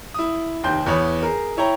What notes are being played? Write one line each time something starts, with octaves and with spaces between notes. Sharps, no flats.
E4 D#6
F1 D#2 G5 C6 G6
E2 B3 C#5 B5 D#6
G#4 A#4
E4 C#5 G5 A#5